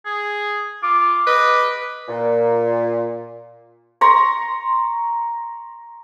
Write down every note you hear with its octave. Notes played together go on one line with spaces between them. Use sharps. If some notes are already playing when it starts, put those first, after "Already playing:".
G#4
F4 D6
B4 D#5
A#2
A#5 C6 C#6